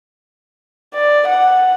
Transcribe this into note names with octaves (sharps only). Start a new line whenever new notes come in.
D5
F#5